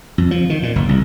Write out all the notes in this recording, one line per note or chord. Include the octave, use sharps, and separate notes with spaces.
F2
F3
D#3
A#2
F#1
C2